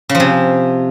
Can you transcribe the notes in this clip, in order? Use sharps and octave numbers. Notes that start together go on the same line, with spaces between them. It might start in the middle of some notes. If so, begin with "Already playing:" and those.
C#3
F3
C3